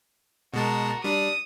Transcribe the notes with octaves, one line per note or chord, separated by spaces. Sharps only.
B2 G#3 F#4 A#4 A5
G3 D4 D#6